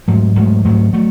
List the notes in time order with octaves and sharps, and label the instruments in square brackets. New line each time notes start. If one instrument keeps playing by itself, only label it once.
[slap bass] G#2 F#3 A3
G#2 F#3 A3
G#2 F#3 A3
F#3 A3